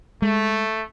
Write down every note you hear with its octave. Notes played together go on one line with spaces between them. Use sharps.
G#3 A3